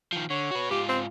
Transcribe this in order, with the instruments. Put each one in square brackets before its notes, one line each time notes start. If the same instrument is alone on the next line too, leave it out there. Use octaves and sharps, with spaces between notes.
[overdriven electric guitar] D#3 F3
[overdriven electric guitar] D3 [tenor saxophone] C#5
[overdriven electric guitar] F#4 B4
[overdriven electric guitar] G#2 F4 [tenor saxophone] G4
[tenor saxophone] C4